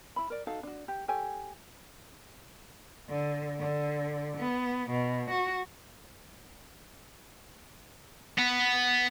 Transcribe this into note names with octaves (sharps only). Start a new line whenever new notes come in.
E4 B5
A#4 D5
D#4 F#4 A4 F5
D4 F#4
G4
G4 A4 C#5 G#5
D3
D3
B3
B2
F#4
B3